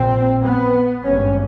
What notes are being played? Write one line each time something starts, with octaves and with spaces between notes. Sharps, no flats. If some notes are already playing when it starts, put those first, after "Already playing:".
Already playing: A#1 A#2 C4
B3
G#1 G2 C#4